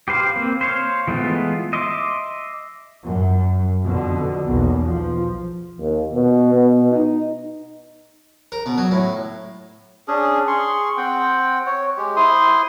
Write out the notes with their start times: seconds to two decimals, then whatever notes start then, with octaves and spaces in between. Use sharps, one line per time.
0.08 G4 B4 C5 F5
0.36 A#3 C4
0.61 C5 C#5 F5
1.07 E3 G#3 A3 B3 F4
1.73 D#5 E5 C6 D6
3.05 F#2
3.83 F2 B2 D3
4.46 B1 E2 B2 A#3
4.82 F3
5.79 D#2
6.14 B2
6.54 B2
6.92 D#4
8.52 A#4
8.66 B2
8.78 F#3
8.91 A2
10.08 C#4 D4 G#4
10.47 G#4 C6 C#6
10.97 C4 F#5 G5
11.66 C#5
11.97 G#3 G4
12.16 E4 C5 C6 D#6